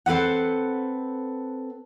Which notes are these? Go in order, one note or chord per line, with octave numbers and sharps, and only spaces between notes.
C4 A4 B4 F#5